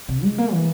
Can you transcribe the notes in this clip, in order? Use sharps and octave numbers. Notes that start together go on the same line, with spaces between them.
C3
G#3
A#3
E3